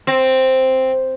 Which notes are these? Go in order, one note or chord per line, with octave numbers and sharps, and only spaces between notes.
C4